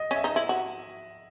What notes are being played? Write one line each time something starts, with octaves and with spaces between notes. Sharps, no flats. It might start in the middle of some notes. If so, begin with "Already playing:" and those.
Already playing: D#5
C#4 E5
D#4
E4
F#4